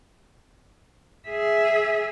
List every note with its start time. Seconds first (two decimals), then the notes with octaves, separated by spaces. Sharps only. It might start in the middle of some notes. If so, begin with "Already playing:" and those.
1.29 G#4 E5